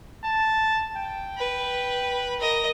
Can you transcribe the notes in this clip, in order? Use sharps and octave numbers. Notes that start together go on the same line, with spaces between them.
A5
G5
B4
A#4 D#5